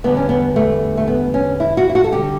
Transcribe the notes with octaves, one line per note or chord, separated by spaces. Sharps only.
E2 D3 G3 B3
C#4
B3
A3
A3
B3
C#4
E4
F#4
E4
F#4
A4
D3 G3 G4